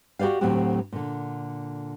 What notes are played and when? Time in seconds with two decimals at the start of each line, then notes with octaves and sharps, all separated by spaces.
0.19 F#4 G4 C5 D5 F5
0.41 D2 A2 F#3 C4 F#4 G4
0.92 A#2 D3